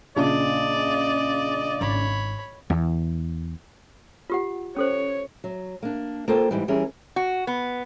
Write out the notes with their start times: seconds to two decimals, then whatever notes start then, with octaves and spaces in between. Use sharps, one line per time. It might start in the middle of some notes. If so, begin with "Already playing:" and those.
0.16 A#1 C#3 D5 D#5 A5
1.81 G#1 C#5 B5
2.70 E2
4.30 F4 G4 F#5
4.76 C#4 A4 C5 C#5
5.44 F#3
5.82 A#3 D4
6.28 A#3 F4 A4 C5 G5
6.51 G#2 E3 G3
6.68 E3 G3 C#4 G#4 A#4
7.16 F#4
7.47 B3